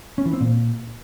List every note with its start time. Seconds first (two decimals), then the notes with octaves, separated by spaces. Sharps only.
0.18 C#4
0.26 E3
0.33 C4
0.41 A#2